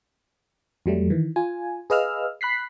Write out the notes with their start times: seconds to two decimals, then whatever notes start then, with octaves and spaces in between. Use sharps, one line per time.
0.86 F2 F#3 G3 A3
1.10 D#3 E3
1.36 F4 G#5
1.90 G#4 B4 D#5 F5 E6 F6
2.41 B5 F#6 B6 C7